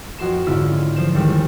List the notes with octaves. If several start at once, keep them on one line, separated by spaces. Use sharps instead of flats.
F2 F#4 C6 E7
G#2 D3 C#4 E4 F4
F3 C5 E7
D#2 G3 G#3